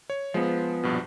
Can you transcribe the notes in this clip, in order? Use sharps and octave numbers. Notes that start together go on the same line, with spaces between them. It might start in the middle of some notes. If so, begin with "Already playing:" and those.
C#5
F3 G#3 B3 C5
A#1 G2 B2